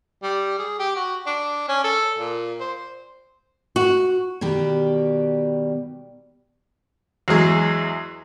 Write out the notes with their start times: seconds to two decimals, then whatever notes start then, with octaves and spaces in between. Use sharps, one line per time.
0.23 G3
0.59 G#4
0.79 G4
0.96 F#4
1.26 D4
1.69 C#4
1.84 A4
2.19 A#2
2.60 C5
3.76 F#4
4.41 B2 D#3 G3 G4
7.28 E2 F#3 G#3 G#4